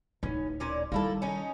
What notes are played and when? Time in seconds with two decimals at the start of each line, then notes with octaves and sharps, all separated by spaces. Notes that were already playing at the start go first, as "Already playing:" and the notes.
0.23 D1 B3 C#4 D#4
0.60 A#2 C#4 D5
0.92 D#3 G3 A#3 E4 A4
1.22 C#4 D#4